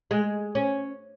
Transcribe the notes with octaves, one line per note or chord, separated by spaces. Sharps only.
G#3
C#4